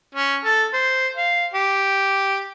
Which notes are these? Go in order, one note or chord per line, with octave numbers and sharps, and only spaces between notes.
C#4
A4
C5
F5
G4